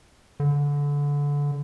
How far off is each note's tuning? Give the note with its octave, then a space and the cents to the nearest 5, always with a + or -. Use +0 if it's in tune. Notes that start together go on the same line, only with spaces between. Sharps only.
D3 -25